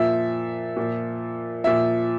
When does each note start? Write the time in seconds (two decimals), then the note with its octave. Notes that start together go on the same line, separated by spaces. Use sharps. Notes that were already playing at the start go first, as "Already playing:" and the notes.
Already playing: A#2 F3 E5
0.76 A#2 F3
1.64 A#2 F3 E5